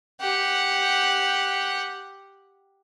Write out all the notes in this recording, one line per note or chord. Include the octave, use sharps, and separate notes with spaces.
G4 F#5